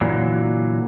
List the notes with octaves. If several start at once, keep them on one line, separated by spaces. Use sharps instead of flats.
A#2 D3 E3 F#3